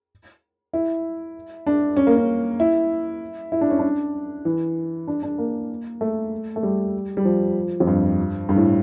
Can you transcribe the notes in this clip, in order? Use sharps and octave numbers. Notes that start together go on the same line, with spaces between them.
E4
D4
C#4
A#3
C#4
E4
E4
D4
C#4
D4
E3
D4
D4
A#3
A3
A3
G3
G3
F3
F2
G2
G2
A2